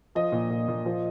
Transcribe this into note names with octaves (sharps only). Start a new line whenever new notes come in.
F3 D#5
A#2
A#2
A#2
F3